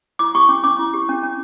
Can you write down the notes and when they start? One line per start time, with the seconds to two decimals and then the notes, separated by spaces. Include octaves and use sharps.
0.19 E4 D6
0.35 G4 C#6
0.49 C#4 D6
0.64 C#4 D6
0.79 E4
0.93 G4
1.09 C#4
1.23 C#4